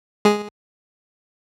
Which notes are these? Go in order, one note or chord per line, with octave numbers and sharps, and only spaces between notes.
G#3 G#4